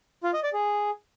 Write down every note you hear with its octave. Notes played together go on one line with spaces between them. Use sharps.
F4
D#5
D5
G#4